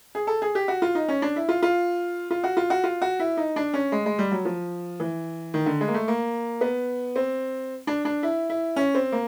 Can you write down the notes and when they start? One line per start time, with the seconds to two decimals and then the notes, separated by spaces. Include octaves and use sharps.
0.15 G#4
0.27 A4
0.42 G#4
0.55 G4
0.68 F#4
0.82 F4
0.95 D#4
1.08 C#4
1.22 D4
1.36 E4
1.49 F4
1.63 F4
2.31 F4
2.44 F#4
2.57 F4
2.70 F#4
2.84 F4
3.02 F#4
3.19 E4
3.37 D#4
3.56 D4
3.74 C#4
3.92 G#3
4.06 G#3
4.19 G3
4.32 F#3
4.45 F3
5.00 E3
5.54 D#3
5.66 D3
5.81 G#3
5.88 A#3
5.94 A3
6.08 A#3
6.61 B3
7.16 C4
7.87 D4
8.05 D4
8.23 E4
8.50 E4
8.76 C#4
8.95 C4
9.12 A#3